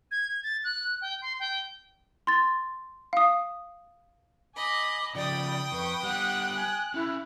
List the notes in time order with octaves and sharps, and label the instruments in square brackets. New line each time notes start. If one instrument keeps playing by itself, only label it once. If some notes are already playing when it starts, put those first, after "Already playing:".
[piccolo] G#6
A6
F#6
G5
C6
G5
[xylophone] C6 A6
F5 D#6
[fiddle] D#5 B5 [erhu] G#5 [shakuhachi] D6
[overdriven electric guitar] C#3 F3 [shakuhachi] D5 [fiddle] G5 D#6 [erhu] B5
[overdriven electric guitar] F2 [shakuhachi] B4 [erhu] C#6
[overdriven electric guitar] G3 B3 [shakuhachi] F#5 [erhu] F#6
[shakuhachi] G#5
[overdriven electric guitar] C#4 B5 [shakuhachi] E4